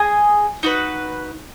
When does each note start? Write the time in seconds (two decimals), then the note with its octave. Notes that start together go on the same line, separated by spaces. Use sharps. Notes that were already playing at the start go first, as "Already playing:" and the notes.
Already playing: G#4 D#5 G#5
0.63 D#4 F#4 B4